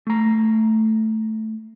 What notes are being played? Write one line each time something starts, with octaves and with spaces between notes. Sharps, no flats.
A3 A#5